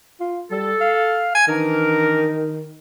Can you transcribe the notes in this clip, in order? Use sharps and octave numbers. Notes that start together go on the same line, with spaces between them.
F4
G3 A4
F5
G#5
D#3 E3 D4 A#4